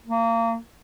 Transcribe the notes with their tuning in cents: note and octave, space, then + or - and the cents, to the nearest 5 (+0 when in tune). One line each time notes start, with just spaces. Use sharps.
A#3 -30